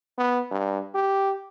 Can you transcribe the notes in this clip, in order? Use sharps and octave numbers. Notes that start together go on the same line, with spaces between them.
B3
G2
G4